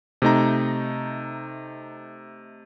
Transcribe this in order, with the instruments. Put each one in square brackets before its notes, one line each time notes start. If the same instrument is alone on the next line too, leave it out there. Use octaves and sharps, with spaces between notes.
[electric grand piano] C3 A3 D#4 A#5